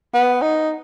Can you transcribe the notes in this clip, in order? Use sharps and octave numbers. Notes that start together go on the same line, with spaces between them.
B3
D#4